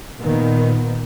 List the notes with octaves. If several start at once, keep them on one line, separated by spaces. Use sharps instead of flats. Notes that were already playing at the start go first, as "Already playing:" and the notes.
A#2 D#3 B3